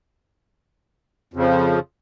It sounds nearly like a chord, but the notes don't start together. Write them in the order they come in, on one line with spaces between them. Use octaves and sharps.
F2 C#3 F3